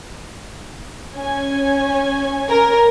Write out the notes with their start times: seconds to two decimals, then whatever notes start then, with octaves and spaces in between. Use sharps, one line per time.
1.16 C#4 G#5
2.50 A#4